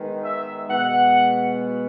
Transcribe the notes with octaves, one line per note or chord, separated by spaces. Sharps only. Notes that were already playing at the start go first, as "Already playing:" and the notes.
Already playing: D#3 G#3 B3
E5
B2 G#3 B3 F#5